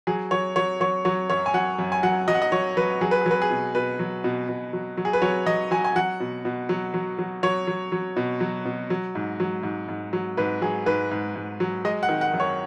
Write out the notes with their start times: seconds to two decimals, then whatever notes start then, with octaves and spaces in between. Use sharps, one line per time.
0.07 F#3 G#4
0.31 F#3 C#5
0.56 F#3 C#5
0.80 F#3 C#5
1.05 F#3 C#5
1.30 F#2 C#5
1.46 G#5
1.54 F#3 F#5
1.79 F#2
1.92 G#5
2.03 F#3 F#5
2.28 F#3 D#5
2.35 F#5
2.42 D#5
2.52 F#3 C#5
2.77 F#3 B4
3.01 F#3 G#4
3.11 B4
3.21 F#3 G#4
3.31 B4
3.42 G#4
3.51 B2
3.75 B2 B4
3.99 F#3
4.24 B2
4.49 B2
4.73 F#3
4.97 F#3
5.05 G#4
5.13 B4
5.22 F#3 C#5
5.46 F#3 D#5
5.71 F#3 G#5
5.84 G#5
5.95 F#3 F#5
6.20 B2
6.45 B2
6.69 F#3
6.94 F#3
7.19 F#3
7.43 F#3 C#5
7.67 F#3
7.92 F#3
8.17 B2
8.40 F#3
8.65 B2
8.90 F#3
9.15 G#2
9.40 F#3
9.63 G#2
9.88 G#2
10.13 F#3
10.37 G#2 B4
10.62 F#3 G#4
10.86 G#2 B4
11.11 G#2
11.35 G#2
11.60 F#3
11.85 G#3 D#5
12.03 F#5
12.09 D#3
12.21 F#5
12.34 F#2
12.40 C#5